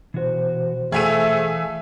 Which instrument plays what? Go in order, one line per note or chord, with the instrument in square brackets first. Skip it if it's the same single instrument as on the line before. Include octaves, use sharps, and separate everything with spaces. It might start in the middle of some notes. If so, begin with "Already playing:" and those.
[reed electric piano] B2 C5 [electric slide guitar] E3 F#4
[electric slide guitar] E3 F5 [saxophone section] A3 [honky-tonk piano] G#4 E5 D#7